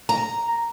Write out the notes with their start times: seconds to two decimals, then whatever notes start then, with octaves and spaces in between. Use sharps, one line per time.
0.09 A#5